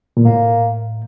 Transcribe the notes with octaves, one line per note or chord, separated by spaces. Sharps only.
A#2
A2 A#3